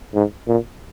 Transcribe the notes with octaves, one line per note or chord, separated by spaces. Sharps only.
G#2
A#2